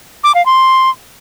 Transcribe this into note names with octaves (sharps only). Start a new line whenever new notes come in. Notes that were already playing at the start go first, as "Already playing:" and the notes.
D6
F5
C6